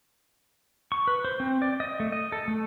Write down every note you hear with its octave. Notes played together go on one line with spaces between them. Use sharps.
C#6
B4
C5
C4
D5
D#5
A3
D#5
A4
A3